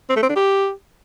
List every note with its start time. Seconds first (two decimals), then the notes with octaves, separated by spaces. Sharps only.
0.09 C4
0.16 A3
0.23 C4
0.29 D4
0.36 G4